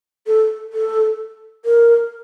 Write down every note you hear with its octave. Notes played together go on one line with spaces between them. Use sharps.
A4
A4
A#4